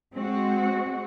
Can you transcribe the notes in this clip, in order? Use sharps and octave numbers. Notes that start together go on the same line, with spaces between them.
G#3 C4 F#4